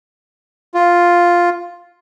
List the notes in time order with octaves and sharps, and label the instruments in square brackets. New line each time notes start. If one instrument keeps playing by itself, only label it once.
[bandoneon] F4